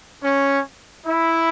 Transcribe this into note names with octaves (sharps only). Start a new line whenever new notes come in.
C#4
E4